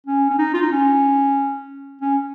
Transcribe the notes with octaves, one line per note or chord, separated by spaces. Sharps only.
C#4
C#4
D#4
F4
D#4
C#4
C#4